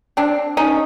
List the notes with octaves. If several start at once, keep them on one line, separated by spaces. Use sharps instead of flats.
C4 D4
C#4 D#4